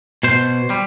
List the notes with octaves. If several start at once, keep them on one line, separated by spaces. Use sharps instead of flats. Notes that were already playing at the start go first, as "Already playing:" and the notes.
B2 C5
G3